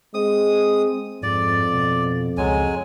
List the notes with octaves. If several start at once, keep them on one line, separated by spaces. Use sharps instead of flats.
G#3 C4 D#6
F2 G#2 D5
B2
C#2 F#3 G#3 G#5